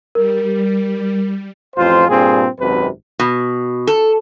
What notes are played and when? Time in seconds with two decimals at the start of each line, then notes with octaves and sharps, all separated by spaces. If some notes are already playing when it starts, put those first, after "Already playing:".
0.15 G3 A#4
1.76 A1 F2 F4 C5
2.09 G2 A#2 C4 G#4
2.59 G#1 F#2 C3 B4
3.19 B2
3.87 A4